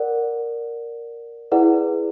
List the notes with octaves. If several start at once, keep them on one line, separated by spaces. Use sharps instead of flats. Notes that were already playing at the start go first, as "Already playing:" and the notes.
Already playing: A#4 D5 F#5
E4 G#4 B4 D5 F#5